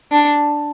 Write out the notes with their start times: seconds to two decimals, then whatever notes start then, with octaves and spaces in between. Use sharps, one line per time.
0.12 D4